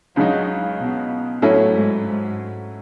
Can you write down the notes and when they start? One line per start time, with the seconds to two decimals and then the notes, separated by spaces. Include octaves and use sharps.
0.16 C#2 C#3 F#3 G#3 D#4
0.80 B2
1.42 A2 F#3 A3 C#4 E4
1.73 G#2
2.05 G#2